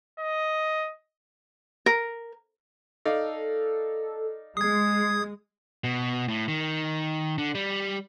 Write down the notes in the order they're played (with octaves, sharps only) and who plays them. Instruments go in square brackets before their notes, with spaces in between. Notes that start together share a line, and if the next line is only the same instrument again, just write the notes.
[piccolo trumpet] D#5
[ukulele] A#4
[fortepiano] D#4 D5 F5 [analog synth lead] A4
[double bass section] G#3 [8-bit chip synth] D#6 G#6 [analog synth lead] C7
[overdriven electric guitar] B2
A2
D#3
D3
G3